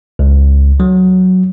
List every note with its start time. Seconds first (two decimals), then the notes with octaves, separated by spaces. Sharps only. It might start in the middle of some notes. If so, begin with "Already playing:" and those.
0.19 C#2
0.80 F#3